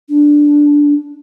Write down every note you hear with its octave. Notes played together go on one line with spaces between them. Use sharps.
D4